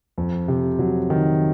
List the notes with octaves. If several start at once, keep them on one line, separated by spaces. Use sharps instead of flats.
F2
C3
F#3
D#3